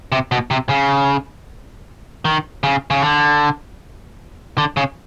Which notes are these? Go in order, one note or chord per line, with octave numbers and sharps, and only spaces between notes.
C3
B2
C3
C#3
D#3
C#3
C#3
D3
D3
C#3